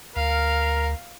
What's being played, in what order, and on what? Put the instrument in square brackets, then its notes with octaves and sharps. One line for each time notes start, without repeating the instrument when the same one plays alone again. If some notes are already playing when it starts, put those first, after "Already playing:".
[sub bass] D2 [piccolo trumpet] A#4 [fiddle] F5